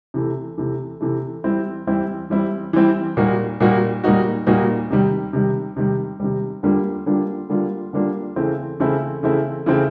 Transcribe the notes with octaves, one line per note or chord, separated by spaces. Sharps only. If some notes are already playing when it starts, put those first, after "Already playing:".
C3 E3 A3
C3 E3 A3
C3 E3 A3
E3 G3 C4 E4
E3 G3 C4 E4
E3 G3 C4 E4
E3 G3 C4 E4
A#2 G3 A#3 D#4 F#4
A#2 G3 A#3 D#4 F#4
A#2 G3 A#3 D#4 F#4
A#2 G3 A#3 D#4 F#4
C3 D#3 G3
C3 D#3 G3
C3 D#3 G3
C3 D#3 G3
D3 G3 A#3 D4 F4
D3 G3 A#3 D4 F4
D3 G3 A#3 D4 F4
D3 G3 A#3 D4 F4
C#3 E3 A3 C4 E4
C#3 E3 A3 C4 E4
C#3 E3 A3 C4 E4
C#3 E3 A3 C4 E4